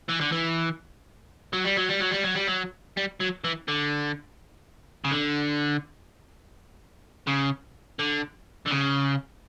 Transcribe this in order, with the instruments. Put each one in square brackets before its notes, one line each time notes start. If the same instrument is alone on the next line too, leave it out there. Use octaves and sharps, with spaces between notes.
[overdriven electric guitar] E3
D3
E3
F#3
G3
F#3
G3
F#3
G3
F#3
G3
F#3
G3
F#3
E3
D3
C#3
D3
C#3
D3
D3
C#3